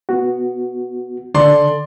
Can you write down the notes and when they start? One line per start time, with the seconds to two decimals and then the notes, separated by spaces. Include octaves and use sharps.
0.09 B3 F#4
1.35 D3 A4 D5 C6